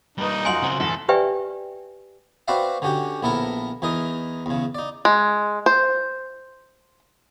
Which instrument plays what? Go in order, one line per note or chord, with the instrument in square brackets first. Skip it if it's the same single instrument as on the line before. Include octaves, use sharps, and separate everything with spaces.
[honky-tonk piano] G2 B4 [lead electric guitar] G3 A#3 [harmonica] D#4
[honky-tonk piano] F#2 F4 F#4 [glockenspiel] G#5 C6 F#7
[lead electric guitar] C#3 C4
[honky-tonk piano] B1 E2 A2 [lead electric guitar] A4
[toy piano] G4 B4 D5 E5 G5 G#5
[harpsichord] C4 F#4 B4 D5 E5 F5
D3 C#4 F#4 G4
A#1 B3 E4 A4 A#4 A#5
E2 E3 D#4 A#4 D#6
E2 C#3
D#4 D5
[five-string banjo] G#3
C5